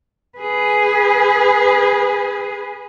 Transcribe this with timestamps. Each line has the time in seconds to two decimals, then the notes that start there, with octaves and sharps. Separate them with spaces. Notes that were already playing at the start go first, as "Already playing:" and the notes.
0.38 G#4 B4